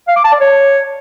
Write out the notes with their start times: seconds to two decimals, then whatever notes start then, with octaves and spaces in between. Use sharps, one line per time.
0.08 F5
0.16 D6
0.24 A5
0.32 D5
0.40 C#5